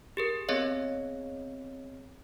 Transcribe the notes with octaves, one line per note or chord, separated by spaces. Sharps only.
G4 G#4 A#4
B3 C4 G#4 C#5 D#5 F5